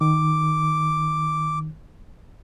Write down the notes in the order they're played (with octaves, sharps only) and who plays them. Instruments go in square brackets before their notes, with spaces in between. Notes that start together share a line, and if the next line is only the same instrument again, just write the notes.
[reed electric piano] D#3 [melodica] D6